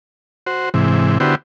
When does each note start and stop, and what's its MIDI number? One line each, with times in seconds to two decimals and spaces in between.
0.47 0.69 66
0.47 0.69 72
0.74 1.18 44
0.74 1.18 48
0.74 1.18 52
1.20 1.35 50
1.20 1.35 59
1.20 1.35 64
1.20 1.35 66
1.20 1.35 67
1.20 1.35 72